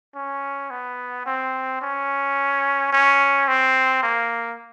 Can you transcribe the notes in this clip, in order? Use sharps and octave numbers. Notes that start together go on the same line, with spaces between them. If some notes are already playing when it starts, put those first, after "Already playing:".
C#4
B3
C4
C#4
C#4
C4
A#3